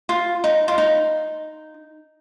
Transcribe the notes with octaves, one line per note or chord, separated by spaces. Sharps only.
F4
D#4
F4
D#4